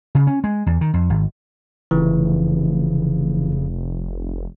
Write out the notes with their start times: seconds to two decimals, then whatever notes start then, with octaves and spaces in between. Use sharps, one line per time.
0.15 C#3
0.27 C#4
0.44 G#3
0.66 E2
0.81 D#3
0.94 F2
1.10 G#1
1.91 F1 C#3 E3